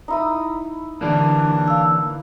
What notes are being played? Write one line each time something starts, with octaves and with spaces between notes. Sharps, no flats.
D#4 E4 D#6
D3 E3 A#3 D4
F5 E6